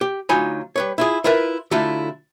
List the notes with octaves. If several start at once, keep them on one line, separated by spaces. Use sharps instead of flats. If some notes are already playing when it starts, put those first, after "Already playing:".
G4
D2 F#3 D#4 F4 G#5 B5
G3 B4 C#5
E4 F4 G#4
E4 F4 A#4 B4 E5
D3 F#3 A3 E4 F4 A4